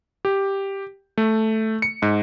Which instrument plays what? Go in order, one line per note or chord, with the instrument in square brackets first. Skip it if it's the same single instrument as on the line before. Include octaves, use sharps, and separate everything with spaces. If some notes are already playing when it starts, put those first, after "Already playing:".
[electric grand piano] G4
A3
C#7
G#2